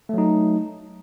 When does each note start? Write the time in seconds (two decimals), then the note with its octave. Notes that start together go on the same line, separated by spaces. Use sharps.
0.09 A3
0.14 F#3
0.18 D#4